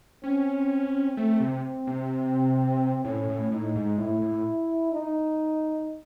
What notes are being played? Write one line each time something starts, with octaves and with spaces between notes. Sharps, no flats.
C4 C#4
A3 C4
C3
C3
A2 C#4
A2
A2 D#4
G#2
A2 E4
A2
D#4